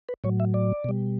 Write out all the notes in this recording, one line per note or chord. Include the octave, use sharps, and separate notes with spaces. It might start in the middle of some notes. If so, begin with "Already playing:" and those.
B4
A2 F#3 C#5
E5
D5
B2 G3